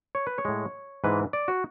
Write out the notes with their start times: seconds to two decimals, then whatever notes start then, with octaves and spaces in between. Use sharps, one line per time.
0.15 C#5
0.27 B4
0.38 C#5
0.45 A2 G#3
1.04 G#2 E3 G#3 B4
1.33 D5
1.48 F#4